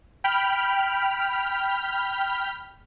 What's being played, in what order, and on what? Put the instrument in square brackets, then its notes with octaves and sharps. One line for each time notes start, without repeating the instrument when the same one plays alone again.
[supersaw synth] G5 B5 F6